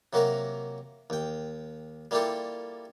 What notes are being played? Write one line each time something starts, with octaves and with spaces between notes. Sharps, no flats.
C3 F#3 A#3 F#4 A#4
D#2 G5
G3 A#3 E4 F4 G4 A4